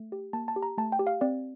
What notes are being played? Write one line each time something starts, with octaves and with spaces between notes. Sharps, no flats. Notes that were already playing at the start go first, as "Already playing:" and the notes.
Already playing: A3
G4
A#3 A5
A5
G4
A#5
A3 A5
G5
G4
F5
C4 D5